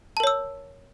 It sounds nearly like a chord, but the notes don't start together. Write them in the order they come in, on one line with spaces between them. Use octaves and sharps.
A5 A#4 C#5 E6